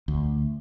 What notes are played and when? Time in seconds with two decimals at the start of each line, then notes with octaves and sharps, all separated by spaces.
0.08 D2